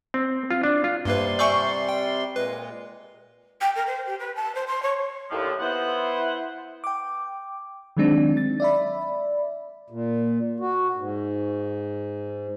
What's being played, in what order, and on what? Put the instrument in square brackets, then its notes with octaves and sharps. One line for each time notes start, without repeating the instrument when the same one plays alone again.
[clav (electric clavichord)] C4
F4
D4
F4
[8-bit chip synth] G2 A#3 B4 [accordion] C3 G3 C6
[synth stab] D5 E5 C#6 [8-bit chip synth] G#5 G6
[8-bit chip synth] G5
[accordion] A#2 G#3 [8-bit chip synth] B4
[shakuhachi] G5
A#4
C5
G4
B4
A5
C5
C6
C#5
[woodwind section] D#2 A2 D3 F3
B3 E4 C5 F#5
[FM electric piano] G5 D6
D#3 F#3 G#3 C4 D4 D#4
A6
D5 E5 B5
[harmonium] A#2
F#4
G#2